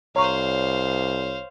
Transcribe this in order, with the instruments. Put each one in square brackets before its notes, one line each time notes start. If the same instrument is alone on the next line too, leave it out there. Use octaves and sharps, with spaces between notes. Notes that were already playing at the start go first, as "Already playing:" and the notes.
[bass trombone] C2 [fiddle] C5 F5 [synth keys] C#5 [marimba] A#5 C#6